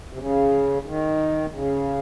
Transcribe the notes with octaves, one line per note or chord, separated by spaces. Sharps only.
C3
C#3
D#3
C#3